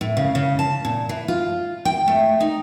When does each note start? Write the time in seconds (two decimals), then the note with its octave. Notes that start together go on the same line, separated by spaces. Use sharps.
0.01 A2
0.17 C#3
0.35 C#3
0.59 A5
0.85 A#2
1.09 E3
1.28 F4
1.85 G5
2.08 A3
2.40 D#4